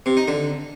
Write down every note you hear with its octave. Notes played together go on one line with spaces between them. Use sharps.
C3
D#4
D3